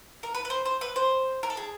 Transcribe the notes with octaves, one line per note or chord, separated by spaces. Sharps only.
A#4
B4
B4
C5
C5
B4
C5
A#4
A4
G#4